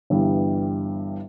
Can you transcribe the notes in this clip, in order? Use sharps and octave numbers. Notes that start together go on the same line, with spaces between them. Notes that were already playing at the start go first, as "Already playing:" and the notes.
G1 G2 E3 G3